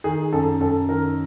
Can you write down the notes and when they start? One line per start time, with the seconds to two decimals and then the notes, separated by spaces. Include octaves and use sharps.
0.04 D#3 G#4
0.33 F#2 A4
0.60 F#2 A4
0.89 D#3 A#4